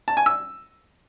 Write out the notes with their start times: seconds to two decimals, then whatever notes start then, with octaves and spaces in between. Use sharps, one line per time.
0.08 A5
0.17 G#5
0.26 E6